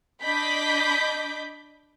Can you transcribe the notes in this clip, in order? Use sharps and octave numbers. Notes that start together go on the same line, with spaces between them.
D4 D#5 B5 D6 G6 B6